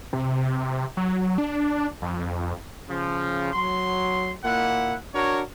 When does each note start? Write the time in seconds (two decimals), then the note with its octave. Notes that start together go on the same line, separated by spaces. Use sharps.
0.13 C3
0.97 F#3
1.38 D4
2.02 F2
2.89 C#3 F3
3.53 F#3 C6
4.44 A#2 A#3 E4 F#5
5.15 D4 F#4 A#4 C#5